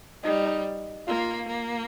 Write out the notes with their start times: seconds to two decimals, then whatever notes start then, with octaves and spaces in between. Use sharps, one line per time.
0.24 G3 D#4
1.07 A#3 F4
1.48 A#3